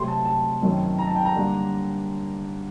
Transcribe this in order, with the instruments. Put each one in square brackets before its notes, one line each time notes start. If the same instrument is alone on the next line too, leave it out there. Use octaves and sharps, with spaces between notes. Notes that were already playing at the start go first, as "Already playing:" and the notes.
Already playing: [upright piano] C3 F#3 A3 C4 C6
A5
A5
F#2 D#3 F#3 C4
A#5
A5
G5
A#5
D3 G3 A#3 D4